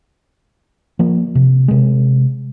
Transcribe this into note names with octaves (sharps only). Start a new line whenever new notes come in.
F3 A#3
C3
C3 G#3